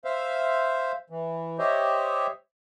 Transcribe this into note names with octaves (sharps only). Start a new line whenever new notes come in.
C5 E5 F5
E3
G4 C5 C#5 D#5 E5